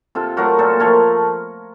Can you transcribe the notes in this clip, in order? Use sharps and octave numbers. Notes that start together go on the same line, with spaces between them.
C3 F4 A4
F#3 A3 F#4 A#4
A#2 A4 C5
F3 A3 A#4 C#5